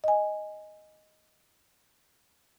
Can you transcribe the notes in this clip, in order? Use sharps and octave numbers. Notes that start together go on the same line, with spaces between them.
D#5 G#5